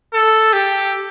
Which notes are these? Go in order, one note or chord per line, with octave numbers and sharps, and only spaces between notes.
A4
G4